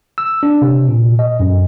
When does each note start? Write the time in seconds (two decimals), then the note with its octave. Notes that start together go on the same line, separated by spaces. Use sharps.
0.18 E6
0.43 D4
0.62 C3
0.89 A#2
1.19 D#5
1.40 F#2